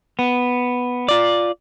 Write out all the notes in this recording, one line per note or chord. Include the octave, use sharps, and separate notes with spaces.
B3
F4 D5